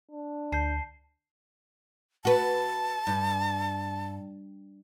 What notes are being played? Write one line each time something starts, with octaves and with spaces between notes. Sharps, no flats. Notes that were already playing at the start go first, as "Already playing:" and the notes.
D4
D2 A5 G6 C7
F#4 B4 A5
G2